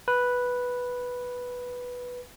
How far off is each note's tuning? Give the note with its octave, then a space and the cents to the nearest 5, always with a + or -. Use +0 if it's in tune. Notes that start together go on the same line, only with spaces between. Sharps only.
B4 -5